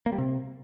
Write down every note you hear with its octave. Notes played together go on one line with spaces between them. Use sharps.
A#3
G3
C3